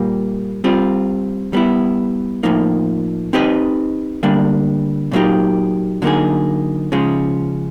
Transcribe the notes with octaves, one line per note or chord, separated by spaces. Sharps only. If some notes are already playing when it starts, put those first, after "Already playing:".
Already playing: A#2 G3 A#3
G3 C4 F4
G3 B3 E4
A2 F3 A#3 D#4
C4 D#4 G4 B4 D#5
D3 G3 A#3 D4
A#2 F#3 A#3 D#4 G4
D3 F#3 A#3 D#4 G#4
C#3 F3 G#3 C#4